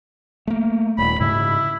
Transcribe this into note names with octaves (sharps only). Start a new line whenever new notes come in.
A3 A#3
D#1 B5
G#2 C#3 E4